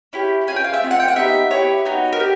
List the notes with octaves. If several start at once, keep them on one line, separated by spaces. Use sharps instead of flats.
C#4 E4 G4
C#4 F4 G#4 G#5
G5
F5
E5
A3 C4 F4
F#5
G5
F#5
B3 D#4 G4 E5
B3 E4 G4 C#5
B3 D#4 F#4
A#4
G4